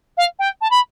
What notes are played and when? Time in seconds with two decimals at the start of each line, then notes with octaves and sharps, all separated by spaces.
0.17 F5
0.39 G5
0.61 A5
0.70 B5